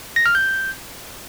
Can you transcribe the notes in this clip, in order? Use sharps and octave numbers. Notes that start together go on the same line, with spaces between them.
A#6
F6
G6